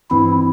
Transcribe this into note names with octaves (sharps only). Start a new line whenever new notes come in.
G2 E3 C4 E4